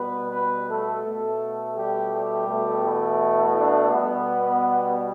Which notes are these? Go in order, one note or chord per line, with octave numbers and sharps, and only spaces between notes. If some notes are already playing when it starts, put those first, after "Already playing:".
Already playing: B2 G3 B3 B4
B3 B4
A3 A4
B2 A3
G3 G4
G3 G4
B2 A3
E3 E4
D4
B2 G3 B3